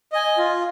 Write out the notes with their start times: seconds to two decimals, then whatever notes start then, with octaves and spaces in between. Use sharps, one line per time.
0.12 D#5 G#5
0.38 F4